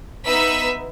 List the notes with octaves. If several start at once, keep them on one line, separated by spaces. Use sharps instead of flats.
B3 D#4 B4 E5 E6 B6